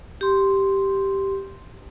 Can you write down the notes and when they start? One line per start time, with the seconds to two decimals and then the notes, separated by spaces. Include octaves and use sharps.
0.21 G4 C6